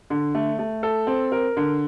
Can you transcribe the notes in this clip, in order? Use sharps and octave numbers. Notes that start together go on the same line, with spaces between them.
D3
A3
A3
A4
C4
A#4
D3